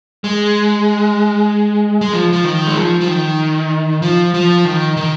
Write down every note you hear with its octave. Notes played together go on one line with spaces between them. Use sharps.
G#3
G#3
F3
F3
D#3
G#3
F3
F3
D#3
F3
F3
D#3
D#3